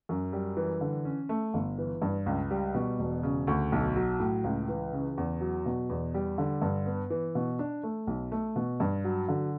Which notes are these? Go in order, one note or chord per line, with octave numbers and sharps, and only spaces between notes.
F#2
G3
E3
D3
C#4
A3
G1
E3
G2
C#2
G3
B2
E1
C#3
D2
B1
F#3
A2
C#2
E3
C#3
E2
F#3
B2
E2
G3
D3
G2
B3
E3
B2
D4
A3
B1
A3
B2
G2
F#3
D3